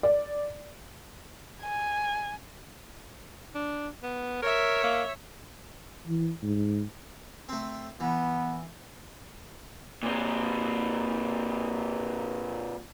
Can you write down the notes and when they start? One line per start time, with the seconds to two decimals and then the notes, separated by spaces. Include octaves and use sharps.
0.03 D5
1.62 G#5
3.55 D4
4.03 B3
4.42 A#4 C#5 E5
4.84 A#3
6.07 E3
6.43 G#2
7.49 A3 C4
8.00 E3 B3
10.03 A#2 C4